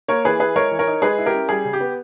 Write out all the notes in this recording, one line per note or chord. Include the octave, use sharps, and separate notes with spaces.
A#3 A#4 C#5
E3 G#4 B4
E4 G#4 B4
G#3 A#4 C#5
E3
A#4 C#5
D#4
G#3 G#4 B4
E4
G4 A#4
C#4
G3 G#4
C#3
G4
B3